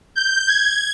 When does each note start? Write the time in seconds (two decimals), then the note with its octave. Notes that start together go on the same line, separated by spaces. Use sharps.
0.16 G6
0.48 G#6